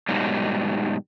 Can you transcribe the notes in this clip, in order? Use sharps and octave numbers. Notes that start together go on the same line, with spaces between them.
G#2 B2 D#3 F#3 G3